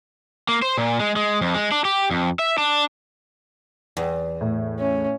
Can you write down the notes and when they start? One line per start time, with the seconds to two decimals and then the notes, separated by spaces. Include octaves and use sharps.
0.49 A#3
0.62 C5
0.78 A#2
1.00 G#3
1.16 G#3
1.41 F2
1.55 G#3
1.72 D4
1.85 G4
2.11 F2
2.39 E5
2.58 D4
3.97 E2
4.41 A2
4.79 C#4